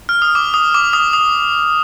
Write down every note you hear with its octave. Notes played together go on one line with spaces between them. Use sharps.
F6
D#6
D6
D#6
D6
D#6
D#6